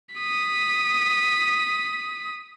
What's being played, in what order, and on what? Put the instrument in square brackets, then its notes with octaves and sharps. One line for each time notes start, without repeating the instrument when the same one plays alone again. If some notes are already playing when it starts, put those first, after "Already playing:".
[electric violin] D#6 B6